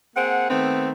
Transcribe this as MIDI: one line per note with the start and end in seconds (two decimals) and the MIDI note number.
0.15 0.48 58
0.15 0.48 60
0.15 0.48 68
0.15 0.48 78
0.50 0.91 51
0.50 0.91 57
0.50 0.91 59
0.50 0.91 60